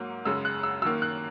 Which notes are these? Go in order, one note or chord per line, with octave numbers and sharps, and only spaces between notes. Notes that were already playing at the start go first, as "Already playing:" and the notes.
Already playing: G#2 F#3 A#3
F#2 C#3 G#3 E6
F#6
E6
F#2 D#3 A#3 E6
F#6